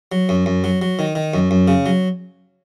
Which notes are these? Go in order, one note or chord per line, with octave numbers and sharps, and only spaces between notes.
F#3
F#2
F#2
F#3
F#3
D#3
D#3
F#2
F#2
C#3
F#3